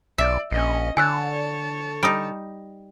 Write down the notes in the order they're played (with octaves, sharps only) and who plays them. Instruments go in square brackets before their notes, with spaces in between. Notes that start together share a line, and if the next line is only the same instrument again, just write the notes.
[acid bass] B1 [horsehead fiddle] D5 [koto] E5
[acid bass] A#1 [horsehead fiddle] C#4 D#5
[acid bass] D3 [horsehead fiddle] C#5 A5 [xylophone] G#5 E6 F#6
[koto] G3 D#4 [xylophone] D#6 D7